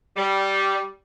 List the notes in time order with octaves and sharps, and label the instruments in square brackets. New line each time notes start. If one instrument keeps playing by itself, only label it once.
[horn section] G3